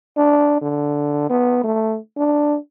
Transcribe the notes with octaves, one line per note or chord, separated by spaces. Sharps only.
D4
D3
B3
A3
D4